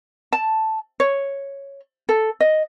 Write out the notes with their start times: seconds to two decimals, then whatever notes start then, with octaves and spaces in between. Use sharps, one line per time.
0.33 A5
1.00 C#5
2.09 A4
2.40 D#5